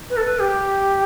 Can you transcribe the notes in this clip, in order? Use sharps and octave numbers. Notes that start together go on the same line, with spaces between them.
B4
A4
B4
G4